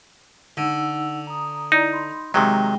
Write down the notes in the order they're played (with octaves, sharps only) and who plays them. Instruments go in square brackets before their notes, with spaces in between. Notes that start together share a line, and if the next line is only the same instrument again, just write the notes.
[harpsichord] D3 [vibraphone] D#4 F#5 E6
[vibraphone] A#5 D#6
[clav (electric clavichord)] D#4 [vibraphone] E4 D5 A#5
[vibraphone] B5 C6
[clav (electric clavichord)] C3 D#3 F#3 [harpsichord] G#3 [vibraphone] G5